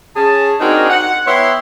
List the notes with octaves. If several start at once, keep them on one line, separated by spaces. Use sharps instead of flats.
C#4 G#4 A5
C4 D4 D#4 F#4 G#4 A#4
F#5
B3 E4 C#5 G5 C6